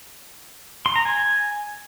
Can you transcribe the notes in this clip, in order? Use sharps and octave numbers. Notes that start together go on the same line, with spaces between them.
C6
A#5
G#5